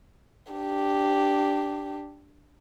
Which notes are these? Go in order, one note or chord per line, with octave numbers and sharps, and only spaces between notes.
D4 G4